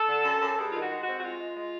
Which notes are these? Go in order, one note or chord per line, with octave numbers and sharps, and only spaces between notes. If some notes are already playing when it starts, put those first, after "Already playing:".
Already playing: A4
D3
F#2
F#2
G2 G#4
D#3 F4
F#4
G#3
C4 F#4
F#4
G#3 F4
G#3
G#3